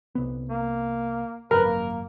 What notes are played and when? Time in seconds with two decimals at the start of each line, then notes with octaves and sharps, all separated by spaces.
0.15 C2 B3
0.49 A#3
1.51 G#1 F#2 A#4 B4
1.65 A#3